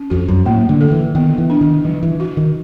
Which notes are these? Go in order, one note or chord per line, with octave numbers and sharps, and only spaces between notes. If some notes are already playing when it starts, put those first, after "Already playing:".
Already playing: C#4
F2 F#4
F#2
A2 A#3
D3
A4
E3
D#3 B3
E3
D4
D#3
E3 F#3
E3
F#4
D#3